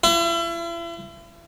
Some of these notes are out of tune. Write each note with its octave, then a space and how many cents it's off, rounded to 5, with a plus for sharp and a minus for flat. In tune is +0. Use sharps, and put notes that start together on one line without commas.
E4 +40